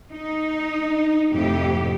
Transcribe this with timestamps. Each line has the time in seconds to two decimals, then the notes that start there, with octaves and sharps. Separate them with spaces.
0.11 D#4
1.32 F2 A2 C3 G4